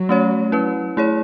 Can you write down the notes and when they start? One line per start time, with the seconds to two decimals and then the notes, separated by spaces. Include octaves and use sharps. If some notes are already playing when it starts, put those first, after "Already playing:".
Already playing: F#3
0.09 A3 C#4 F#4 C#5
0.52 C#4 E4 B4
0.97 A3 E4 G#4 C#5